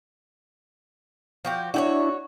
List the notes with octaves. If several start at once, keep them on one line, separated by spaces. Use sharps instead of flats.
F3 F#4 G4
D4 E4 F#4 G4 C#5